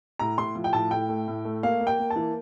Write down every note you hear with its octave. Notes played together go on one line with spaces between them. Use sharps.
A2 A#5
A2 C6
F3
G5
A2 A5
A2 G5
A3
A2
A3
A#3 F5
A#3
G5
A#3
A5
E3